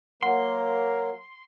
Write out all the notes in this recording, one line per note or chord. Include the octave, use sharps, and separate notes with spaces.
F#3 A#3 A#4 F#5 C6